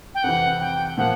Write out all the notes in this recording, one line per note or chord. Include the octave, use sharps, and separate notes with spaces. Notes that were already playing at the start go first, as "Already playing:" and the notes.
G5
F2 C3 E3 F#5
G5
A#2 F3 A#3 F#5